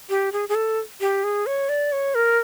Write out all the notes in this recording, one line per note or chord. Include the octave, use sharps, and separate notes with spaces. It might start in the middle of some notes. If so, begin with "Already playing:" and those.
G4
G#4
G#4
A4
G4
G#4
C#5
D5
C#5
A#4